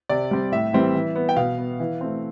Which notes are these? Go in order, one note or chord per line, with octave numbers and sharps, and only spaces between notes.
C3 D5
G3 C4
A2 E5
E3 G3 C4
E3
B3
G5
B2 F5
B3
E3
A3 C4